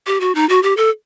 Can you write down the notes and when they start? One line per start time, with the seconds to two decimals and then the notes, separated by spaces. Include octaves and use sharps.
0.07 G4
0.20 F#4
0.35 D#4
0.49 F#4
0.63 G4
0.77 A4